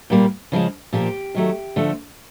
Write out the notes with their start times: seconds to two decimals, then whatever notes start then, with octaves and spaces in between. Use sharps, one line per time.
0.10 A#2 G3 A#3
0.52 C#3 F3 G#3
0.93 A#2 F3 A#3 G4
1.35 D#3 F#3 A3
1.76 D3 F3 A3